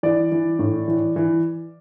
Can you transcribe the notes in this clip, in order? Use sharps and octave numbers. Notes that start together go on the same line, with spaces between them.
E3 D5
E3
A2
E3
E3